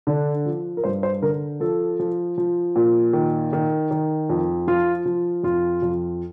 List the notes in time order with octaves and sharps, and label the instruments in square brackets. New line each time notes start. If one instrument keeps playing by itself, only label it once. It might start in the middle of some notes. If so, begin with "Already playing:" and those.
[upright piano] D3 D4
F3
A#4
G2 C5
C5
D3 A#4
F3 A4
F3
F3
A#2
D#3
D#3
D#3
F2
F3 F4
F3
F2 F4
F2